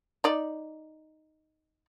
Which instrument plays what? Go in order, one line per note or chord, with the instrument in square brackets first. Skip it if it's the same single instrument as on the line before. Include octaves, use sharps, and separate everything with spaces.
[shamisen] D#4 D5